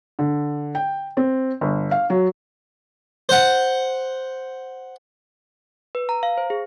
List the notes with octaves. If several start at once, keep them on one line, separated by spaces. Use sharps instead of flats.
D3
G5
C4
G1
F5
F#3
C5 F#5
B4
A#5
F5
C5
G#4